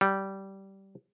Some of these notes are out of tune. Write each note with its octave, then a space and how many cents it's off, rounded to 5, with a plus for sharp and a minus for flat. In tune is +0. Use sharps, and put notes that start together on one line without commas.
G3 -15